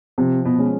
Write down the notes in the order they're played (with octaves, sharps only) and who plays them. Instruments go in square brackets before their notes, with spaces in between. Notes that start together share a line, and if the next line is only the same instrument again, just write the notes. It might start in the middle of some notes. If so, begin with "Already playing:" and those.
[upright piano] C3 [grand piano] F3
[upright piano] B2
[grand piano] G#3 C#4